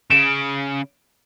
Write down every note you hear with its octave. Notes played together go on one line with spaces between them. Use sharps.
C#3 D7 E7